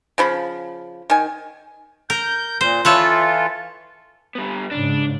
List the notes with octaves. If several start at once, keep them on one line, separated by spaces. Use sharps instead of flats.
C#3 F3 B5
D#3 G#5
A#4 G6
A#2 C5
E3 F4 A4 B4 C#5 E5
G3 B3
G#2 C#3 D4